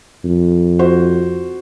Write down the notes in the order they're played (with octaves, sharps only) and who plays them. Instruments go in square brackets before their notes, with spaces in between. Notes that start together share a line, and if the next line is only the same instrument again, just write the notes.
[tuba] F2
[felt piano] F#4 C5